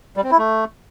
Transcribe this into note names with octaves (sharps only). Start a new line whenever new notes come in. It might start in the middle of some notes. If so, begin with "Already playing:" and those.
G3
C4
E4
A3